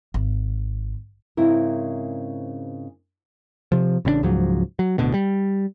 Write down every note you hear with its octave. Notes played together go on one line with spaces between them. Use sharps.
G#1
G#2 C#3 C4 E4 A#4
C3 F3
A1 C#3 B3 D4
C#2 G#2 F3 F#3
F#3
D1 D2 B2 D3
G3